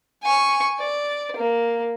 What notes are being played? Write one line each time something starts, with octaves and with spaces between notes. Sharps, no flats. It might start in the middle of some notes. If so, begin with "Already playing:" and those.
G#5 C#6
D5
A#3